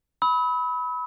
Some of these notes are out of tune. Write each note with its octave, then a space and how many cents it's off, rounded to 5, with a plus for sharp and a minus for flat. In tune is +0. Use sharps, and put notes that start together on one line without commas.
B5 +0 E6 -45